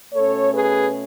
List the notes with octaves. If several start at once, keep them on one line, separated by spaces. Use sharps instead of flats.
B2 A3 C#4 A4 C#5
G#4 B4